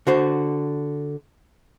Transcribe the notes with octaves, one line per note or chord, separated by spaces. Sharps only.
D3 F#4 C5